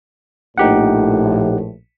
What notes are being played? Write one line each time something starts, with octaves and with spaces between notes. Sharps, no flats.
A#1 A2 D#4 G4 F#5